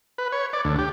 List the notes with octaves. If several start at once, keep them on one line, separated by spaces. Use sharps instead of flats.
B4
C#5
D5
D2
G4